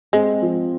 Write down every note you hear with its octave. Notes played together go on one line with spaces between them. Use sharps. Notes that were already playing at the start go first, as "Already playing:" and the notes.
G#3 C4
F3